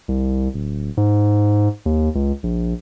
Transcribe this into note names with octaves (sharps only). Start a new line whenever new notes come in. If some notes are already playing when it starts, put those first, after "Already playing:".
C2
D1
G#2
D#2
C#2
A#1